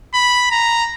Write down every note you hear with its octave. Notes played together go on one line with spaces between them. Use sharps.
B5
A#5